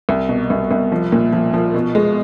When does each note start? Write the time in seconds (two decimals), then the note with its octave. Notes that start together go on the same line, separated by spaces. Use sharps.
0.09 C2
0.29 B2
0.50 C2
0.71 C2
0.92 F3
1.12 A#2
1.33 F3
1.53 F3
1.74 B2
1.95 G#3